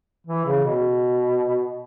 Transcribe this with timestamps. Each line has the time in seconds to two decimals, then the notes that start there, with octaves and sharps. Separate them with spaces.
0.27 E3
0.45 C#3
0.64 B2